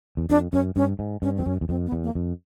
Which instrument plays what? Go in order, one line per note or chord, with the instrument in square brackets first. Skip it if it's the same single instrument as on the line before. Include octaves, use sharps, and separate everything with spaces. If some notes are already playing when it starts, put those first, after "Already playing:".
[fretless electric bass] E2
[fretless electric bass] F2 [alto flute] D4
[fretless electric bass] F#2 [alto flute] C#4
[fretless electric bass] G2 [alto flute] C#4
[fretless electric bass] G#2
[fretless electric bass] G2 [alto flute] C#4
[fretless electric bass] F2 [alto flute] C4
[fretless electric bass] F#2 [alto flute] C#4
[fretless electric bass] E2
[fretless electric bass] F2 [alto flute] C4
[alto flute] B3
[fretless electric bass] E2
[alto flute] A#3
[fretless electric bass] F2